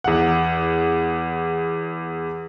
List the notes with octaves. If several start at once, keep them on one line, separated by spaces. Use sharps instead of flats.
E2 F#5